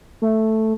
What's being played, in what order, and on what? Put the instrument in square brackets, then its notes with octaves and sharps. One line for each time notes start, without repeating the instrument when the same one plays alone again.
[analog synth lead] A3